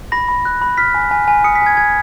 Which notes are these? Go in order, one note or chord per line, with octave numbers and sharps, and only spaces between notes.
B5 A#6
B5
F#6
B5
F6 B6
G#5
G#5
G#5
D#6 C#7
B6
G#5
G#6
G#5 G#6